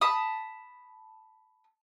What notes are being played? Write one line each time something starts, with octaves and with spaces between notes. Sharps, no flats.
A5 B5 D#6